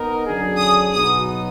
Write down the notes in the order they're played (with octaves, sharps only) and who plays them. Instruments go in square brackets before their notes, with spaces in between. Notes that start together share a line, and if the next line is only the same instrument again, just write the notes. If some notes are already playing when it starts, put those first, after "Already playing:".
Already playing: [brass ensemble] B3 D#4 A#4
F#2 D3 F#3 D4 G#4
[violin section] D#6
[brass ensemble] B2 F#3 B3 D#4 [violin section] D#6